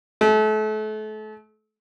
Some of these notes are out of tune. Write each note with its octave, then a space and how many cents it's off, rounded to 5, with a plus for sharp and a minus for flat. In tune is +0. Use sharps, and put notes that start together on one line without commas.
A3 -35